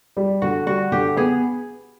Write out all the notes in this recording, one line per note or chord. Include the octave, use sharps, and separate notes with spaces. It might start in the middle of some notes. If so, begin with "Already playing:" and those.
G3
D3 F#4
G3 F#4
D3 G4
B3 G#4